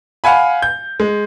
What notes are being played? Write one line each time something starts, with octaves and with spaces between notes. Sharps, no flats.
F5 F#5 G#5 B5
G6
G#3